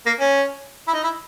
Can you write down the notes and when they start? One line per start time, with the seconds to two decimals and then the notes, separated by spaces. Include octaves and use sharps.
0.06 A#3
0.20 C#4
0.88 E4
0.94 D#4
1.04 E4